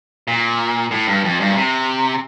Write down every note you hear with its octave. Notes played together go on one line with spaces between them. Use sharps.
A#2
A2
G2
F2
G2
A#2
C3